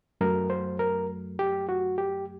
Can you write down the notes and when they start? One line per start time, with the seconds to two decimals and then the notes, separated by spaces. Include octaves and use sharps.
0.21 F#2 F#3 A3 A#4
0.50 C5
0.79 A#4
1.39 G4
1.69 F#4
1.98 G4